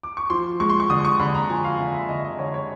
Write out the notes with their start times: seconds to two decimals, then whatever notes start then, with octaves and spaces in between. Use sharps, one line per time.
0.03 D6
0.17 C#6
0.30 F3 C6
0.60 G#3 C#6
0.70 C6
0.80 C#6
0.90 D3 D#6
1.05 C#6
1.20 D3 B5
1.35 A#5
1.50 F3 G#5
1.64 F5
1.79 D3 E5
1.94 E5
2.09 D3 D#5
2.25 D#5
2.39 D3 C#5
2.54 C#5